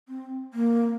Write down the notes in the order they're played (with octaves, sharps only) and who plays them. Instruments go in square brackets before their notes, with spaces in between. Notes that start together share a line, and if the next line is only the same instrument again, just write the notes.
[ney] C4
A#3